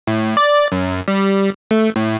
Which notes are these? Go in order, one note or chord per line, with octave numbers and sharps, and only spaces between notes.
A2
D5
F#2
G3
A3
A2